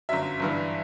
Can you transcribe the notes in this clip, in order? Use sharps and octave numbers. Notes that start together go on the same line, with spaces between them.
G1 F#2 F#3 E5
G1 G2 E3